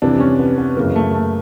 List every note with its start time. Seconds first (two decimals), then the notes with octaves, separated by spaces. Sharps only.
0.02 F2 C3 E3 D4
0.20 C#4
0.39 B3
0.58 B3
0.77 F#2 C#3 E3 A#3
0.91 A#3
0.96 A3
1.14 A3